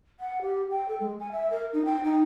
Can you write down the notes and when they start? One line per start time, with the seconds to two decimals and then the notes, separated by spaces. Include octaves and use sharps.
0.20 F#5
0.42 G4
0.70 G5
0.88 A4
1.00 G#3
1.19 G#5
1.32 E5
1.51 A#4
1.73 D#4
1.85 G5
2.04 D#4